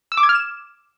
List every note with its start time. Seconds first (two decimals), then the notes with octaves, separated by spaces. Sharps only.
0.12 E6
0.17 D6
0.23 G#6
0.29 F6
0.35 E7